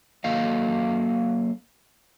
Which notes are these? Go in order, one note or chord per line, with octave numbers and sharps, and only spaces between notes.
F#3 A#3 A4 D#5 F5